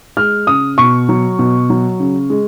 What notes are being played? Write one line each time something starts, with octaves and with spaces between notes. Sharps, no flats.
G#3 F6
C#3 D#6
B2 C#6
F#3
B2
F#3
C#3
G#3